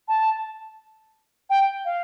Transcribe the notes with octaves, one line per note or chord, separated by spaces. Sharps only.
A5
G5
F5